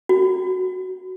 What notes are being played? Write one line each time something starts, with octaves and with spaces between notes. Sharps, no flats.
F#4